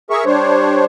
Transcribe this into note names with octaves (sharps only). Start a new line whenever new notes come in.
G#4 A#4 E5 C#6
G3 D4 C5 C#5